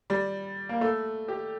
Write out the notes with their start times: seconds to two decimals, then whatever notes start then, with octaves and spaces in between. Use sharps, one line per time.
0.10 G3
0.69 A#3
0.81 A3
1.28 G4